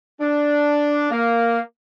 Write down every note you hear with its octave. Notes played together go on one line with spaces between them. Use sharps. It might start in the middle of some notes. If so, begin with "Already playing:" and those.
D4
A#3